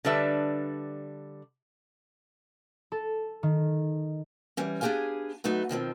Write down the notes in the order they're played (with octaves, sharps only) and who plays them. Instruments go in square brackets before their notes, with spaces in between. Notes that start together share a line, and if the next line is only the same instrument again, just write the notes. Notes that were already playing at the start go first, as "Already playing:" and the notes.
[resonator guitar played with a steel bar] D3 G3 D4 B4 E5
[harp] A4
D#3
[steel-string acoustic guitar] E3 G3 C#4
B3 D4 G4 G#4 F5 G#5
F#3 A3 B3 D#4
B2 D#3 F3 C4